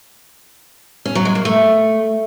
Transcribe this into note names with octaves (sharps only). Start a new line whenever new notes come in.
C#4
F#3
G#3
A#3
A3